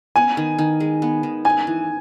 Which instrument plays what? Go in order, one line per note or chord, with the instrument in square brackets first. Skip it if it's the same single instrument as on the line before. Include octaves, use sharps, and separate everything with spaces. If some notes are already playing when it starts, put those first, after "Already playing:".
[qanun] B3 [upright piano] G#5
[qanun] D#3
D#3
G#3
B3
D#3
[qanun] D#4 [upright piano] G#5
[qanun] E3